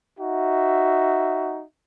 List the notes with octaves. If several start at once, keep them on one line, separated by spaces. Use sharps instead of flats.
D#4 F#4 E5